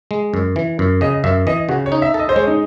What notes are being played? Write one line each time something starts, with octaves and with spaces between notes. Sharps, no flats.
G#3
F#2
E3
F#2
C#3 D#5
F#2 E5
E3 D#5
C#3 F#4
C#5
D#4
E5
A4
D#5
C5
G#3 C#5
D#4